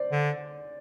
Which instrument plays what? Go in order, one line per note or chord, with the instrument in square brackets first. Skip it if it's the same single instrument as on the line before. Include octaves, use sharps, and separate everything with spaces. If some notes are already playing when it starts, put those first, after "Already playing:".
Already playing: [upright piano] C5 D5
[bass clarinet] D3